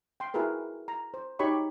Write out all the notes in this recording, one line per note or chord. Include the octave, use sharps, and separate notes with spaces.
G5 C6
E4 F#4 G#4 A#4 B4
A#5
C5
D#4 F#4 G4 C#5 B5 C#6